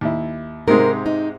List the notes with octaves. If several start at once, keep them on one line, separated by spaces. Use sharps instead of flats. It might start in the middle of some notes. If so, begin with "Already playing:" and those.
D#2 E4
G#2 C3 G#3 A#4
D#4